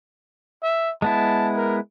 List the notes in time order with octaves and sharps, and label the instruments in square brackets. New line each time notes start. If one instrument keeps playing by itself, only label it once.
[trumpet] E5
[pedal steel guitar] G#3 B3 E4 [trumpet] A5
[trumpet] A#4